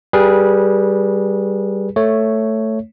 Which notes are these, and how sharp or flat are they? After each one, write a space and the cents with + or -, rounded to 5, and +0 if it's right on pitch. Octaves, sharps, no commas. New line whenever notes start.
G3 +0 G#4 +0 B4 -30
A3 +5 C#5 +0